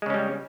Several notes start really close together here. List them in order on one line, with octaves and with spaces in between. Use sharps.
G#3 C#3 C#4 G3